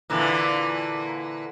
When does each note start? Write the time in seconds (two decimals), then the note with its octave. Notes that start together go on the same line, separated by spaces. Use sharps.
0.10 A#2 D3 E3